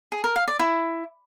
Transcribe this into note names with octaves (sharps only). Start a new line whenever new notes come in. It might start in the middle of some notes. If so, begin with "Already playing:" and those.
G#4
A#4
F5
D5
E4